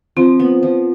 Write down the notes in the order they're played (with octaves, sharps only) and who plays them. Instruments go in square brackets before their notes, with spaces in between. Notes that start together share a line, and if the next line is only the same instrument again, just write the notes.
[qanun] F3 [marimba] C4
[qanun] B3
F3